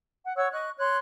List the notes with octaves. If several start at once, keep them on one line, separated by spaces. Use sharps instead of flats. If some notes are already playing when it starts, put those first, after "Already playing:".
F#5
C#5 F#5 C#6 E6
D#5 C#6 F#6
C#5 C6 F#6